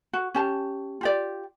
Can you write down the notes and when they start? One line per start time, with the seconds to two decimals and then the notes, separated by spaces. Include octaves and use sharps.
0.13 F#4
0.34 C#4 G4 A5
1.01 F4 G4 D5